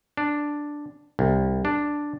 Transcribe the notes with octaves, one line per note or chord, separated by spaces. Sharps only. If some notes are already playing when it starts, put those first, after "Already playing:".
D4
C2
D4